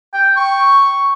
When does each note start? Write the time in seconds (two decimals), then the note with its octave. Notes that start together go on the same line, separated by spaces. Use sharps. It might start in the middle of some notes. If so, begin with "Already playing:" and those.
0.14 G5
0.37 C#6